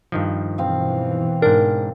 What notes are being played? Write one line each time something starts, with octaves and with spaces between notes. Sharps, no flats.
G2 D#3 F3
B2 E3 C4 F5
G#2 D4 A#4